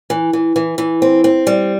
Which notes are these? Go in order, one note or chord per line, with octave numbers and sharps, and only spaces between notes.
E3
E3
E3
E3
C4
C4
G3